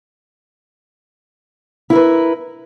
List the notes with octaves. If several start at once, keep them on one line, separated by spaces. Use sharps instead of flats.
E4 A#4 B4